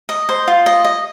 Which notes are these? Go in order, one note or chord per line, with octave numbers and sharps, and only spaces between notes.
D#5
C5
F4
D#5
D#5